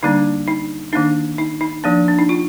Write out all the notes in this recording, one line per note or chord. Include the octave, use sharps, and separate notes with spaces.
D3 G3 A#3 D4 D#4
D#4
D#3 A#3 D4 D#4
D#4
D#4
F3 A#3 D4
D4
D#4
F4